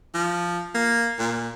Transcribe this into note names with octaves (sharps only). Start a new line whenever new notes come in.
F3
A#3
A#2